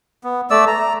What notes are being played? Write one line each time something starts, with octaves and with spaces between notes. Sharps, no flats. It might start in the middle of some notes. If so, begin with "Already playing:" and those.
B3
A3 D5 E6
A#5